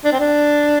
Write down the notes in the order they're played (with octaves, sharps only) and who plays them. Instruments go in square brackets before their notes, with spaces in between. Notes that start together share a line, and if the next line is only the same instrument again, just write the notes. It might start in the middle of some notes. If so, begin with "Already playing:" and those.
[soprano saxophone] D4
C4
D4